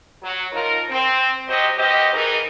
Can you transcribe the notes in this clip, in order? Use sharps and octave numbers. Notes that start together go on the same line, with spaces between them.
F#3
F3 D#4 F4 A#4
C4
F#3 G4 C5 D#5
B2 G4 C5 D#5
E3 D#4 G#4 A#4